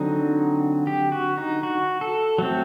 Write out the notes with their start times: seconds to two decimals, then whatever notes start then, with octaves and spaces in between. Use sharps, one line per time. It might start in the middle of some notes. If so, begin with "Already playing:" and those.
Already playing: D3 F#3 C4 D#4
0.87 G4
1.12 F#4
1.38 D#4
1.63 F#4
2.01 A4
2.38 F#3 A3 C4